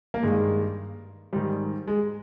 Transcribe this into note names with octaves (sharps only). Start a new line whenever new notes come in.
A#3
G2 D#3 G#3
G#2 D#3 G3
G#3